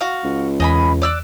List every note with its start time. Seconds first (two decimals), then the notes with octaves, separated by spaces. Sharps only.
0.01 F#4 F5
0.24 C#2
0.60 E2 D#5 G#5 B5
1.02 D5 E6 F#6